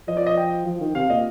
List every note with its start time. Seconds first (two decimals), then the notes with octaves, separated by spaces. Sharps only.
0.08 F3 D#5
0.17 D5
0.27 D#5
0.37 G5
0.66 F3
0.80 D#3
0.95 C3 F5
1.09 A#2 D#5